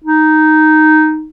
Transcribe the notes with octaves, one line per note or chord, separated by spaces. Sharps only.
D#4